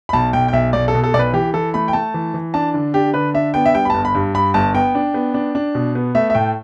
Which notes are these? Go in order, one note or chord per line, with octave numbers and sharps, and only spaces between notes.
B5
B1 A5
B1 G5
G5
B1 E5
B1 D5
A4
B2
A4
B1 D5
B4
E3 G4
E3 A4
A3 B5
G5
A3 A5
E3
E3
D4 A5
D3
D4 G4
D3 B4
D4 E5
B3 G5
E5
G3 G5
B5
G1 A5
B5
G2
G2 B5
G1 A5
B3 G5
D4
B3
D4
D4
B2
B3
A3 E5
E5
A2 G5